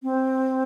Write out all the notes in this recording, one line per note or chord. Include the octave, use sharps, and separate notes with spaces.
C4